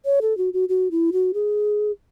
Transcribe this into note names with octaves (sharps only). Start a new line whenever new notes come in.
C#5
A4
F#4
F#4
F#4
E4
F#4
G#4